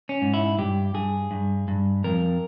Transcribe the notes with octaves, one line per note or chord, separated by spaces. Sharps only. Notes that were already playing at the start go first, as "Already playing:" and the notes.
C#4
G#2
E4
G2 G4
G2 G#4
G2
G2
F2 A#4